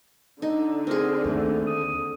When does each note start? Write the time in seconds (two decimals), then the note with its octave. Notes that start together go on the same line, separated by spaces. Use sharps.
0.42 D3 D#4
0.87 C4 G#4 A#4
1.24 D#2 A3
1.67 D#6